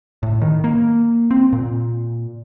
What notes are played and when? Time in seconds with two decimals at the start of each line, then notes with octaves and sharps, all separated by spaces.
0.23 A2
0.41 D#3
0.64 A#3
1.31 C4
1.53 A#2